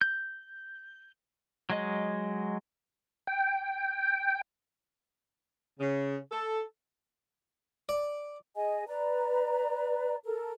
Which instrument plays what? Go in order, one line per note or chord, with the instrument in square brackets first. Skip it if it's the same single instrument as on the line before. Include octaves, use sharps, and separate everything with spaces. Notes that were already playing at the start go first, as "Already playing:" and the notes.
[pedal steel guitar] G6
F#3 G#3 D#5
[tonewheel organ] G5
[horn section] C#3
A4
[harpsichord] D5
[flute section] G#4 D#5 G#5
B4 D5 A#5
A4 A#4